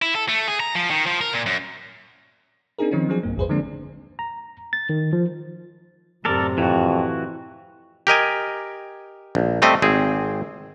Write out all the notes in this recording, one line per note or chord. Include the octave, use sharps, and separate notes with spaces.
E4
A4
A3
G#4
A#5
F3
D#3
F3
A#4
A#2
F#2
C4 D4 D#4 G#4 A#4
D#3 F3 C4 C#4 D#4
F3 F#3 C4 D4 G#4
B1 G2 A#3
A1 E2 G2 G#4 B4 C5
D3 F3 G#3 A#3 C4 D4
A#5
A6
D#3
F3
F#2 A2 C3 A4 A#4 D5
F2 E3 F#4
G4 A#4 D#5 G#5
A#1
G3 A3 C4 D#5
G#1 C4 G#4